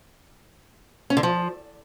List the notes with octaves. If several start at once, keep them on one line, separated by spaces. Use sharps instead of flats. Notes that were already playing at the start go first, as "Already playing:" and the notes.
C#4
D3
F3